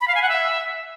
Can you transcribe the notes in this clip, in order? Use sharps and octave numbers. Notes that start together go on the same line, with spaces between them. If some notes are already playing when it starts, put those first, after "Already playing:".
B5
F5
G#5
F#5
E5